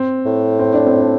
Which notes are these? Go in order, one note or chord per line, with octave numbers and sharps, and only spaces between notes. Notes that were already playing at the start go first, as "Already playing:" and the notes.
Already playing: C4
A2
C4
D4
C4
D4